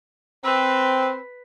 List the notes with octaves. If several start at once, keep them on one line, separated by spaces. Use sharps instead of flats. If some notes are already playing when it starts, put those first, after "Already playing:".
C4 B4